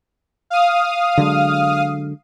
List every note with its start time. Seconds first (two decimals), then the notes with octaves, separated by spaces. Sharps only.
0.50 F5 D#6
1.18 D3 F#3 G#3